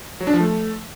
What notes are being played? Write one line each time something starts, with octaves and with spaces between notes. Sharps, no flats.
F#3
D4
F3
A3